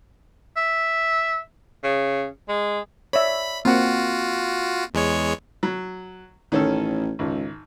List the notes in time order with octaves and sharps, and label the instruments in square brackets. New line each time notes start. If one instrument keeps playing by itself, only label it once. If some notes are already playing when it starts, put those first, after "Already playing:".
[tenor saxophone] E5
C#3
G#3
[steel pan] C#5 D5 E5 [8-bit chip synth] B5
[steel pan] A#3 C4 F#5 [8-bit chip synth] F4 F#4
[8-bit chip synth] E2 G#3 C#5
[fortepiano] F#3
[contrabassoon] A1 [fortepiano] D#3 C#4 A4
[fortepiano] G#1 [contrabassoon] C#2